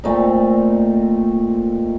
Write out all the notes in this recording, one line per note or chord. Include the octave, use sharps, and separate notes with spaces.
A#2 A3 C4 D#4